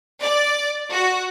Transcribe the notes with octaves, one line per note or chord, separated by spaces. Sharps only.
D5
F#4